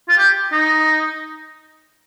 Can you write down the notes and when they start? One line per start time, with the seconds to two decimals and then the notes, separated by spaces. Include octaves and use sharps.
0.09 F4
0.18 G4
0.52 D#4